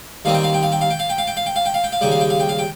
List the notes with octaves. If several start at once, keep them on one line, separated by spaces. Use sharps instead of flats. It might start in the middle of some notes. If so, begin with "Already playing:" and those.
D#2 D#3 G3 C4 F5
G5
F5
G5
F5
G5
F5
G5
F5
G5
F5
G5
F5
G5
F5
G5
F5
G5
F5
D#2 C#3 G3 G5
F5
G5
F5
G5
F5
G5